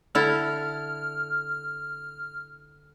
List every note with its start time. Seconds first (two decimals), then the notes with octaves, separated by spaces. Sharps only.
0.15 D3 E4 A4 F6